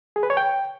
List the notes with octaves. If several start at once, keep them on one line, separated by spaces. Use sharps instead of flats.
G#4
B4
C#5
G5